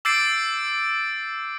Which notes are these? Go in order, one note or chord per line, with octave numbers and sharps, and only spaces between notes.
D6 E6 G6 A6 C7 D7